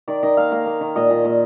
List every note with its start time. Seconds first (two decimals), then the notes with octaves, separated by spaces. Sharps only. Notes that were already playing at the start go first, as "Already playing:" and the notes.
0.08 D#3 D5
0.23 D#3 D#5
0.37 A#3 F5
0.52 A#3 F5
0.66 A#3
0.81 D#3
0.96 A#2 D#5
1.10 A#2
1.25 A#2